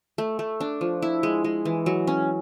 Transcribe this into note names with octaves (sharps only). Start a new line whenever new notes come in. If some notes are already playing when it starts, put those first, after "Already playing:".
A3
A3
D4
F3
E4
G#3
G#3
E3
F#3
C#4